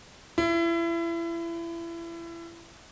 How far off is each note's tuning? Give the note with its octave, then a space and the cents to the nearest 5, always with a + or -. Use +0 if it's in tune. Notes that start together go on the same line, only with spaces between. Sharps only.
E4 +30